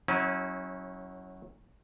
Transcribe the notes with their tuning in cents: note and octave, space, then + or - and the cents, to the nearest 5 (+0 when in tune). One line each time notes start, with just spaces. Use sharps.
F#3 +0 C#4 -20 E4 -40